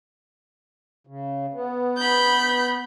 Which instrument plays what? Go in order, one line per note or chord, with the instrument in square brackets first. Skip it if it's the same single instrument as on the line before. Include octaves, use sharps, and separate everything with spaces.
[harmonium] C#3
B3
[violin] B5 G6